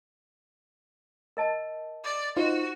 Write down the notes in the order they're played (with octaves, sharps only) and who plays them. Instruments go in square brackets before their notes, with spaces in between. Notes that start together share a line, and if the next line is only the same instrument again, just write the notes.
[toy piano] A#4 D#5 A5
[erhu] D5
[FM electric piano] D#4 F4 C5 [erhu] F#4